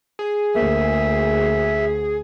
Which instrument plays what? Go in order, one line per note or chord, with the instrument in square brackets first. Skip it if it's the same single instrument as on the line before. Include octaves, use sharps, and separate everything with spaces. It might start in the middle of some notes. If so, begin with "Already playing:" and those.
[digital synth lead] G#4
[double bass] D2 [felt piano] A#3 [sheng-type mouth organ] E5